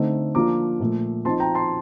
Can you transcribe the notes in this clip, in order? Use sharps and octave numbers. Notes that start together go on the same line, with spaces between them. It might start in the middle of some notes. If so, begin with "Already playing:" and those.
Already playing: D3 A3 C4 D#4
F3 A#3 D4 F4 A#5 D6
A#2 F3 A3
F3 C4 D#4 A5 C6
G5 A#5
A5 C6